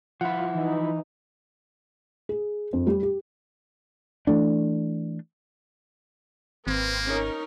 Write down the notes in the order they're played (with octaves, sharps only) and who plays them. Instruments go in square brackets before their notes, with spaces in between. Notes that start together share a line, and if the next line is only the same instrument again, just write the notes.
[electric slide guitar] F3 E4 [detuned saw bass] F4 [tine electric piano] F#5
[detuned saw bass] E3 [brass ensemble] D#4
[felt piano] G#4
F2
G3
G4
[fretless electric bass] E3 A3 D4
[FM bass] G#1 [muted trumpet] A#3 [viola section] C4 B4
[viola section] C#4 D#4 A#4